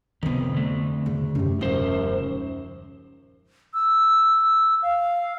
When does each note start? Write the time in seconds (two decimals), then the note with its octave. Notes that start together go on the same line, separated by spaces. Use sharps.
0.23 F2 C3 D#3 B3
0.54 D3 A3
1.06 E2 C#3
1.35 F#2 C3 C#4
1.61 D#1 C#2 F#2 F3 C5
3.74 E6
4.82 F5